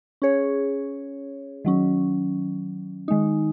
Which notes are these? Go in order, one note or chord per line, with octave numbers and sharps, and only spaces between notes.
C#4 G#4 C#5
D#3 F#3 C#4
D#3 G#3 D#4